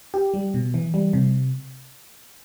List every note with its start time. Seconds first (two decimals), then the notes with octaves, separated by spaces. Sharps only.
0.14 G4
0.34 G3
0.54 B2
0.74 E3
0.94 G3
1.13 C3